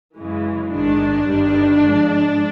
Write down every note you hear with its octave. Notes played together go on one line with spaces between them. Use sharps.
F#2 C#3 E3 G#3
A1 G#2 D#3 G#3 D4
G1 G2 D#3 G3
G#2 F3 G#3